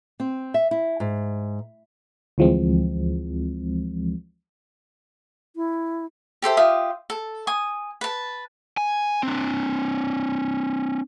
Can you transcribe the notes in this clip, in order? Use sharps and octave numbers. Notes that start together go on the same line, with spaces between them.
C4
E5
E4
G#2
D2 E3 F3 G#3 C4
E4
G4 A4 C5 E5
F4 G4 E5 D#6
A4
G#5 D#6
B4 A5
G#5
C4 D4